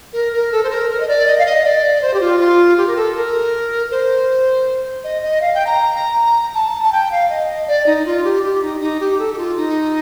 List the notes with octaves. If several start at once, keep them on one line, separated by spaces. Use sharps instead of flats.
A#4
A#4
A4
C5
A#4
A#4
D#5
D5
D#5
F5
D#5
D5
C5
G4
F4
F4
G4
A#4
A4
A#4
C5
D#5
D#5
F5
G5
A#5
A5
A5
G5
F5
D#5
D5
D#4
F4
G4
G4
D#4
D#4
G4
A4
G4
F4
D#4